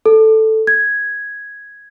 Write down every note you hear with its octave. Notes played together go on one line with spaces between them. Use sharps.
A4
G#6